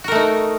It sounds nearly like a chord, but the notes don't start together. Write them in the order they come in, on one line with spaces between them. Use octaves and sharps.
F#4 A#4 A3 D#4